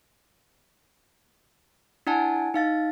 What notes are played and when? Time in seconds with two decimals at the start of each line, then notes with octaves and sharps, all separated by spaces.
2.07 D4 E4 F#5 G#5 A5
2.54 D#4 F5 A6